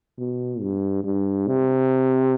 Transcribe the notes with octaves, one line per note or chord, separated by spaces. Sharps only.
B2
G2
G2
C3